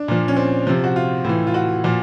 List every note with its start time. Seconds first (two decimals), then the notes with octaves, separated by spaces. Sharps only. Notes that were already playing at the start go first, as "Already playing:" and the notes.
Already playing: D4
0.08 A#2 F3
0.28 C#4
0.36 C4
0.67 C3 F3
0.84 F#4
0.96 F4
1.24 A2 E3
1.47 F4
1.54 F#4
1.84 A#2 F3